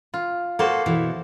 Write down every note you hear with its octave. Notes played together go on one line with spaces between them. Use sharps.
F4
A#3 F#4 A4 C5
B2 E3